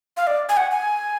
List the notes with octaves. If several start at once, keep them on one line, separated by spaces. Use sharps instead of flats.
F5
D5
G#5
F#5
G#5